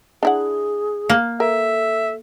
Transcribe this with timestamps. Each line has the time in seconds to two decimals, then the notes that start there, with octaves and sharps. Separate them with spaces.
0.23 D4 E4 G#4 F#5
1.09 A#3
1.40 A4 A#4 E5